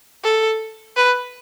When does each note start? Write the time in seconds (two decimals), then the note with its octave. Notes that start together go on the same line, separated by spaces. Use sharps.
0.24 A4
0.96 B4